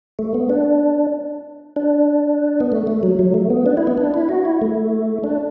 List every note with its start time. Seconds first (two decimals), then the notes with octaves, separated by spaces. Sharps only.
0.19 A3
0.34 B3
0.50 D4
1.76 D4
2.60 B3
2.72 A3
2.87 A3
3.03 F#3
3.19 F#3
3.34 A3
3.50 B3
3.66 D4
3.77 E4
3.87 B3
3.98 D4
4.14 E4
4.29 F#4
4.45 E4
4.62 A3
5.24 D4